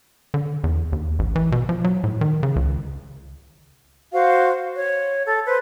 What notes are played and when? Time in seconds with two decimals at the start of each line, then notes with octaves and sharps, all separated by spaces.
0.34 D3
0.64 E2
0.92 D#2
1.19 A1
1.36 E3
1.52 B2
1.69 F3
1.84 F#3
2.04 A2
2.21 D#3
2.43 C#3
2.56 C#2
4.13 F#4 C5 F5
4.75 C#5
5.24 A4
5.46 B4 C5